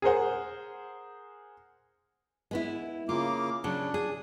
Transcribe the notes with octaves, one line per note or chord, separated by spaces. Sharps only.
G#4 A#4 C5 F#5
G#3 B3 E4
C#3 A#3 F4 D6
C#3 F#3 D4
G#4